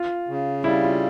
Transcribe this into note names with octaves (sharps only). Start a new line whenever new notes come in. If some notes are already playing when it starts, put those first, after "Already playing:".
Already playing: F4
C#3
G3 E4
F4